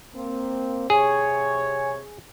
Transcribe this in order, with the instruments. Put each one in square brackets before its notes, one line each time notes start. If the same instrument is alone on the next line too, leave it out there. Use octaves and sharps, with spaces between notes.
[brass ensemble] A#3 C4
[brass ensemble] C3 [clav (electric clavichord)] G#4 [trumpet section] C#5 [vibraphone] G#5